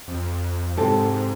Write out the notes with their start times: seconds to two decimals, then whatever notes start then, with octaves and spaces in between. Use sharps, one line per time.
0.08 F2
0.77 G#2 C3 A4